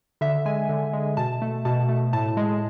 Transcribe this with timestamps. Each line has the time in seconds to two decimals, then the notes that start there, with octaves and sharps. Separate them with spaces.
0.21 D3 E5
0.46 G#3 G#5
0.69 D3
0.93 G#3
1.17 B2 A5
1.42 A3
1.65 B2 A5
1.89 A3
2.13 A2 A5
2.37 G#3